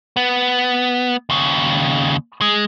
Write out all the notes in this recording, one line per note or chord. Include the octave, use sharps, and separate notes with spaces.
B3
D#2 C#3
G#3